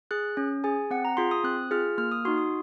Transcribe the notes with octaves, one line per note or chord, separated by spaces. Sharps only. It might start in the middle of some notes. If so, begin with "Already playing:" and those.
G#4 F#6
C#4
G#4 G#5
C4 F#5
A#5
F4 G#4 C6
D#6
C4 F#6
F4 G#4 F6
A#3 F6
D#6
D#4 F#4 C6
D#6